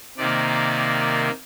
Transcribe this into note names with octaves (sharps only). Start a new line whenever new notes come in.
C3 D#3 A#3 D5
D5